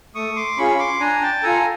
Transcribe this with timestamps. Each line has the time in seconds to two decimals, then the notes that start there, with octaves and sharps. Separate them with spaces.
0.15 A3 C#6 D#6
0.36 C6 D6
0.58 C#4 F4 G#4 B5 C#6
0.79 C6 D6
1.00 D4 G#5 A#5
1.22 G5 A5
1.43 F4 A4 G#5 A#5